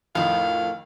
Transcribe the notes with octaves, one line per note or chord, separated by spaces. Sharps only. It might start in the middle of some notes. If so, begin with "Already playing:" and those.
F2 A2 D#3 F5